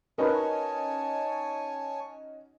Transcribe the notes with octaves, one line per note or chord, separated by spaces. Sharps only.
C#4 D#4 F#4 A#4 B4 C#5 G#5 A5